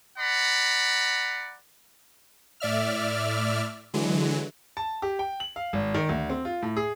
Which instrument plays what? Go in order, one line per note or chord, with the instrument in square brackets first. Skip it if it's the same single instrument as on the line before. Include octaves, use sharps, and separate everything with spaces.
[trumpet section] D5 F#5 A#5 B5
[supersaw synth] A2 D5 E5 F6
D3 E3 F#3 G#3
[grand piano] A5
G4
G5
F#7
F5
G#1
D#3
D2
C4
F4
A2
G#4